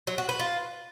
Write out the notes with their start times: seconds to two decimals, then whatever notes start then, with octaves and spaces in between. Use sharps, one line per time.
0.07 F#3
0.18 F#4
0.29 B4
0.39 F4